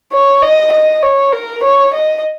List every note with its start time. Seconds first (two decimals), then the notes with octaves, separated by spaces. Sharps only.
0.12 C#5
0.42 D#5
0.72 D#5
1.02 C#5
1.33 A#4
1.63 C#5
1.94 D#5